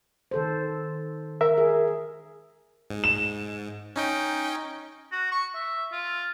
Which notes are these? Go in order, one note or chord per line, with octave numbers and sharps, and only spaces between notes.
D#3 A4 C5
A#4 E5
G#4
G#2
E7
C#4 D#4 G5
F#4
C#6
E5
F4